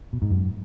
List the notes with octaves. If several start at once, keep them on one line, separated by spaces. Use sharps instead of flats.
B2
G#2
F#2